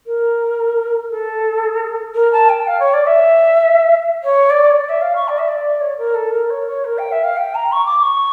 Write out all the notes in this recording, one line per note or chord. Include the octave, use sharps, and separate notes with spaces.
A#4
A4
A#4
A5
G5
F5
C#5
D5
E5
C#5
D5
C#5
D5
E5
F5
C#6
D5
E5
D5
C#5
A#4
A4
A#4
C#5
C#5
A#4
G5
E5
F5
G5
A#5
C#6
D6
D6
C#6